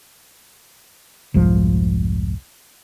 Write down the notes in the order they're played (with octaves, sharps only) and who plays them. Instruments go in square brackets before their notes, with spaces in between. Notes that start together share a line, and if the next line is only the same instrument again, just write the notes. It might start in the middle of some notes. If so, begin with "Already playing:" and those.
[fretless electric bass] F1 C2 G#2 F3